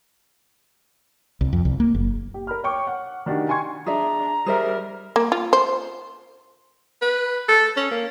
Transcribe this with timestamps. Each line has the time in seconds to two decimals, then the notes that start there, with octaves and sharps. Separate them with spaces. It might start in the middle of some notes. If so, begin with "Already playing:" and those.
1.41 C2
1.53 F2
1.65 C2
1.80 A#3
1.95 F#1
2.34 G4
2.47 A#4 B5 F6
2.64 C#5 G5 C#6 D6
2.87 F#5
3.26 D#3 D4 F#4 G4
3.48 G5 G#5 C6 C#6 G#6
3.86 D4 G#4 D5 E5 A#5
4.46 G3 G#4 A#4 C5 E5
5.16 A#3
5.32 F4
5.53 C5
7.02 B4
7.49 A4
7.77 C#4
7.91 A#3